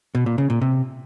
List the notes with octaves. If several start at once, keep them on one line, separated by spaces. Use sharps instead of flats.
B2
A#2
C#3
A#2
C3